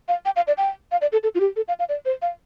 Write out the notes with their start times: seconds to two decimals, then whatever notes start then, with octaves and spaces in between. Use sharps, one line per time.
0.08 F5
0.25 G5
0.36 F5
0.47 D5
0.58 G5
0.92 F5
1.02 D5
1.12 A4
1.23 A4
1.35 F4
1.40 G4
1.56 A4
1.68 F5
1.79 F5
1.89 D5
2.05 C5
2.22 F5